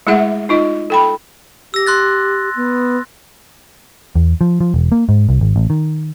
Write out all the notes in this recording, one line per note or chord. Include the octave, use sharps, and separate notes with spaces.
G#3 A3 E4 G#4 E5 F#5
D#4 F4 D#5
A4 G5 B5
G4 E6 A#6
C6 F#6 A6
B3
E2
F3
F3
E1
A#3
G#2
C2
G#1
A1
D#3